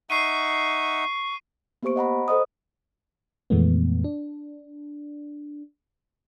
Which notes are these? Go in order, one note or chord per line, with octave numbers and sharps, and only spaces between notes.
D#4 E5 F#5 C#6 C7 D#7
A#3 B3 G4 C5 C#6 D7
D#5 F#5 A#5 B5
A4 C5 D#5 D#6
F2 A#2 E3 G#3 A3 B3
D4